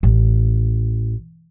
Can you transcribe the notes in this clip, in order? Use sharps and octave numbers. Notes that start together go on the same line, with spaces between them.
A1